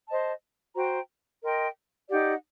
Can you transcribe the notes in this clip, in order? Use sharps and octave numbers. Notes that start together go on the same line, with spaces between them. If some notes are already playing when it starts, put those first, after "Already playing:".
C5 D#5 A5
F#4 C5 G5 A#5
A#4 D#5 G5 C6
D#4 G4 D5 F#5